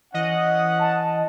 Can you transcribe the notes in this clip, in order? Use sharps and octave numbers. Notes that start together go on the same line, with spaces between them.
E3 C#4 D#5 F#5
A5